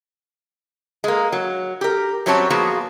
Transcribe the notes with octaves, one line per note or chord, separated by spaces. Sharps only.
G#3 A#3
F#3
G4 A#4
F#2 F#3 G3 C4 C#5 A5
F3 A#3 B3 F#4 G#4